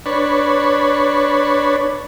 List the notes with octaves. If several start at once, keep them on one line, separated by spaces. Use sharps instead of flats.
D4 B4 C#5